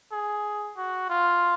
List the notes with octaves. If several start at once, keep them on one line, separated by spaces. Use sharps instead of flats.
G#4
F#4
F4